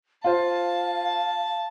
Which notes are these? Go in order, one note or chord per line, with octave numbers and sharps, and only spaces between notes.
F4 C5 F5 A5